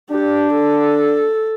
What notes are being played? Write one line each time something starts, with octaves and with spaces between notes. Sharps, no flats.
D4 G4
A4